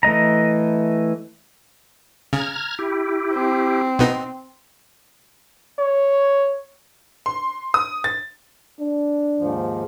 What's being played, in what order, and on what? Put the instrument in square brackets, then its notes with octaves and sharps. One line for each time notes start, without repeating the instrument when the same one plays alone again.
[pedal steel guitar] E3 A3 D#5 A#5
[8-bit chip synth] C#3 [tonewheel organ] A#5 F6 G#6
[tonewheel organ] E4 G4
[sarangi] C4
[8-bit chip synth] B2 B3 D#4
[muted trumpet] C#5
[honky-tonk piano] C6
D#6
A6
[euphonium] D4
[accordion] D#2 G#2 F3